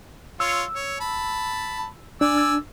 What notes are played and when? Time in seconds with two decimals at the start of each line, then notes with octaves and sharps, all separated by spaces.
0.40 F4 C#5 E6
0.75 C#5
1.00 A5 B5
2.21 D4 D5 G#5 E6